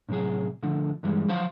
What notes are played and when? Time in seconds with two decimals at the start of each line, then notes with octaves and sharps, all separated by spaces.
0.09 A2 C3 E3 F#3 G#4
0.63 D3 F3 A3
1.03 G2 E3 G3 G#3
1.28 F3 F#3 F#4 C5 F5 C6